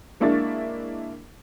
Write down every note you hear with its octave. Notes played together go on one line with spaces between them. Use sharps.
G#3 A#3 D4 E4 C#6 A6